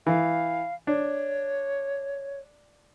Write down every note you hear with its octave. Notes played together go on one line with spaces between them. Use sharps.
E3 F5
D4 C#5